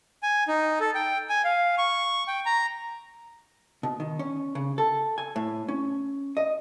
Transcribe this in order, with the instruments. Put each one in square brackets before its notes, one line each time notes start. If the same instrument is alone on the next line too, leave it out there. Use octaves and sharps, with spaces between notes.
[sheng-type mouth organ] G#5
D#4
A4
G5
G#5
F5
C#6
G5
A#5
[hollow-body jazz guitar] B2
D#3
C#4
C#3
A4
G#5
A2
C#4
D#5